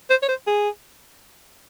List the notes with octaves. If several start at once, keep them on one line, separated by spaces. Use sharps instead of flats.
C5
C#5
C5
G#4